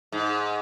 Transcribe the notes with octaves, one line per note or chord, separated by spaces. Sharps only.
G#2